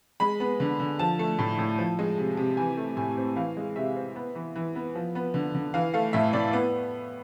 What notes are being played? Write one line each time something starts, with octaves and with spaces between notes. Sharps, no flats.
G#3 B5
B3
D3
D3
F3 A5
A3
A2
A2
F3
G#3
C3
C3
E3 G#5
A3
A2 G#5
C4
E3 F5
G#3
C3 E5
C4
B3
E3
E3
B3
F3
B3
D3
D3
E3 F5
A3 F5
A2 E5
A2 D5
B3